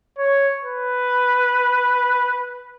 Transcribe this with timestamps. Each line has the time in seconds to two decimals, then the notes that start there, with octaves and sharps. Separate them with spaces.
0.18 C#5
0.64 B4